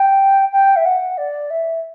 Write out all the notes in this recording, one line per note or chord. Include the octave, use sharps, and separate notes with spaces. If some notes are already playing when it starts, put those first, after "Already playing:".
Already playing: G5
G5
E5
F#5
D5
E5